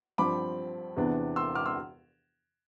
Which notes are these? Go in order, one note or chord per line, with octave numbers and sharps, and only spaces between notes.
G2 F3 C4 B5 D6
E2 C3 E3 B3 D4
C6 E6
D6 F6
C6 E6